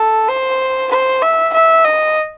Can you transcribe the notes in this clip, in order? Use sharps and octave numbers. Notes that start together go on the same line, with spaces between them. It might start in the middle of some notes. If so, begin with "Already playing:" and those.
Already playing: A4
C5
C5
E5
E5
D#5